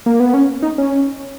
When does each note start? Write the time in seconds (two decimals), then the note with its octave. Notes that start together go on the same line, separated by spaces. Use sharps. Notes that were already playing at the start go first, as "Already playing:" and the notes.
0.06 A#3
0.20 B3
0.34 C#4
0.62 D#4
0.78 C#4